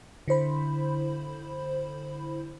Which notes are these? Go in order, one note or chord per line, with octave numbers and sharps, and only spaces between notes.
D3 E4 C5 B5